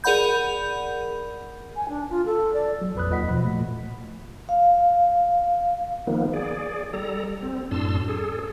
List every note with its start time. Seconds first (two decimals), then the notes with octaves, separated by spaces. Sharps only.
0.04 G#4 A#4 D5 F#5 B5 G6
1.76 G#5
1.88 D4
2.09 F4
2.25 A4
2.53 D5
2.82 F#3
2.95 A#1 F2 B4 B5 D#6 F#6
3.10 D#2 F4 D#5 F#5 B6
3.29 B2 F3 B5
3.45 A#2 F3 A3
4.49 F5
6.07 D#3 F3 A#3 B3
6.33 G#4 D5
6.93 G3 A4 A#5
7.43 C4
7.71 F#2 A2 D4 A5 C6 E6
8.08 G#4 A4